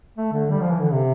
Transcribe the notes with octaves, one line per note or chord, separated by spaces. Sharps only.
A3
D3
G3
F3
E3
D3
C3